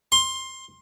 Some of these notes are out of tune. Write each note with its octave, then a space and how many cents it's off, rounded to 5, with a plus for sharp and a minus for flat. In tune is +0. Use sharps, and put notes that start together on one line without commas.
C6 +15